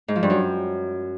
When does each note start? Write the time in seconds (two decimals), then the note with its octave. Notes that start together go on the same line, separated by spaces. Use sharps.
0.08 G#2
0.15 F3
0.23 G2
0.30 F#2